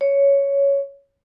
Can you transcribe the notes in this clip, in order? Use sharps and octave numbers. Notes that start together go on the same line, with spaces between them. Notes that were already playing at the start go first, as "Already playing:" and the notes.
C#5